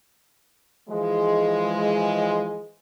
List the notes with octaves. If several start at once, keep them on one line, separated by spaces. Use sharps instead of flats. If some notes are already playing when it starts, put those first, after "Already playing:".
E3 F3 G#3